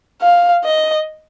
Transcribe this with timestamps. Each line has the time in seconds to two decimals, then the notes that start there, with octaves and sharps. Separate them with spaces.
0.22 F5
0.64 D#5